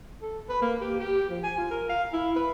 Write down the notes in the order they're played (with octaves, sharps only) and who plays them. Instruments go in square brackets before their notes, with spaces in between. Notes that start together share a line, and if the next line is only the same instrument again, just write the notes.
[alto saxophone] A4
B4
A#3
G4
G4
F3
G#5
F4
A#4
F5
E4
B4